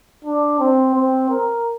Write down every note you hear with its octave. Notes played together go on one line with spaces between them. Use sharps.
D4
C4
C4
A#4